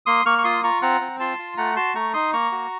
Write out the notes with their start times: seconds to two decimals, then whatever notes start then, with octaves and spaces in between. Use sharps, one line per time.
0.06 A#3 C6 D#6
0.26 A#3 C#6 F6
0.38 C#6
0.44 F4 C6 D#6
0.64 F4 A#5 C#6
0.82 C4 F#5 A#5
1.01 C4
1.20 F4 A5 C6
1.39 F4
1.57 A3 F#5 A#5
1.76 F#4 A5 C6
1.95 A3 A#5 C#6
2.14 D#4 C6 D#6
2.33 A#3 A#5 C#6
2.52 F#4